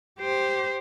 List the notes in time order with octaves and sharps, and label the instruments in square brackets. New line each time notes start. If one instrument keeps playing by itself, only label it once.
[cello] G4 C5